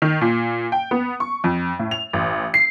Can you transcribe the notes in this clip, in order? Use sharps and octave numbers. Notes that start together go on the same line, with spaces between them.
D#3
A#2
G5
B3
C#6
F2
A2
F7
A1
C7